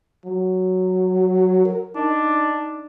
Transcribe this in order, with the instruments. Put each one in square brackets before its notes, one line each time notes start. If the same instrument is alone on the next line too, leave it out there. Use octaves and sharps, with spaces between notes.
[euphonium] F#3
A#4
[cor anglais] D4 [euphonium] D#4